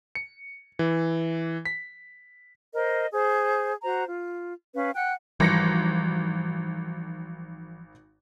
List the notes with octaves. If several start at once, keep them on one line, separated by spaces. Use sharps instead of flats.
C#7
E3
B6
A#4 C5 D#5
G#4 C5
F#4 C5 A#5
F4
C#4 B4 F5
F#5 G5 F#6
G#1 E3 F3 G3 A#6 C#7